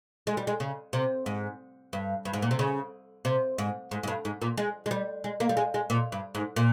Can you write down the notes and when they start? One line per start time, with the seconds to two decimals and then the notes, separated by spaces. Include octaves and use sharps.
0.27 G#3
0.37 G3
0.47 G#3
0.60 C#3
0.93 C3
1.26 G#2
1.93 G2
2.25 G2
2.33 G#2
2.42 A#2
2.51 C3
2.59 C#3
3.25 C3
3.58 G#2
3.91 G#2
4.03 G#2
4.07 G2
4.25 G#2
4.42 A#2
4.57 G#3
4.86 G#3
4.91 G3
5.24 G#3
5.40 A#3
5.49 G3
5.57 G#3
5.74 G#3
5.90 A#2
6.12 G2
6.35 G#2
6.56 A#2